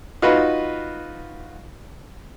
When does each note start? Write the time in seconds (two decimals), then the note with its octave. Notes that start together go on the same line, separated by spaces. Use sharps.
0.22 D#4 F4 F#4 B4